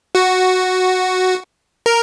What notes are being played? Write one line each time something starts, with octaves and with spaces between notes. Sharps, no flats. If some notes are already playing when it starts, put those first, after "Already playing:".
F#4
A#4